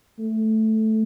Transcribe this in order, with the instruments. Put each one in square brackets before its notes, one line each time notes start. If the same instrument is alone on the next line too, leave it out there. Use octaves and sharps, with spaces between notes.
[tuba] A3